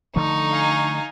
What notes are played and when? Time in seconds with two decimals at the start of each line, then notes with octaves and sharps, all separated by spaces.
0.16 D3 F3 A3 D#4 C#6
0.52 F5 G#5